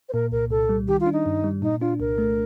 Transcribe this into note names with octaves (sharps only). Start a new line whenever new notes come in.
C5
A#2 A#4
C2 A#4
C2 A4
G3
D#3 G4
F4
D4
D#4
G2
G3
A#2 D#4
D4 F4
C2 A#4
A3